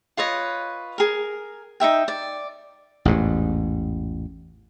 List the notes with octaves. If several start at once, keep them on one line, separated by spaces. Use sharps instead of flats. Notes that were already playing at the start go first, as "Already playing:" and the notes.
F4 B4 C#5 D#5
G#4 A#4
D#4 E4 E5 G5
D5
A1 E2 G#2